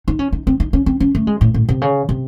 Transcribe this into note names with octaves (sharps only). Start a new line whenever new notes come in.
D#4
C#4
D#4
C4
D#4
C#4
C4
C#4
A3
G#3
A2
A2
C3
C#3
C3